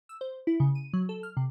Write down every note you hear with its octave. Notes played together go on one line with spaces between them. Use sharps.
E6
C5
E4
C#3
D#7
F#3
A4
F6
C3